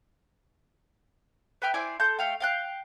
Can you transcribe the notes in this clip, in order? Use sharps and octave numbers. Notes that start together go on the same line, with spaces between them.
B4 E5 G5 F6
E4 C5 D5 G#5
A4 C6 G6
A3 F5 G5
F5 G5 F#6